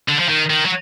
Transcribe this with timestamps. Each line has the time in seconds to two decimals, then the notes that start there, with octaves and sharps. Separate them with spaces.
0.08 D3
0.19 F3
0.28 D#3
0.50 D#3
0.66 F#3